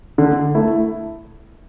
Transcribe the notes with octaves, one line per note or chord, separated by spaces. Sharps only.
D3
A3 E4